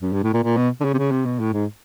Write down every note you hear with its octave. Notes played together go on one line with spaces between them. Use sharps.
F#2
G2
A2
A#2
A#2
B2
D3
C#3
C3
C#3
C3
B2
A2
G#2